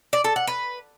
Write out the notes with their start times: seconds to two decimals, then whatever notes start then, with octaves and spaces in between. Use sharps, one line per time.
0.13 D5
0.24 A4
0.36 F#5
0.47 B4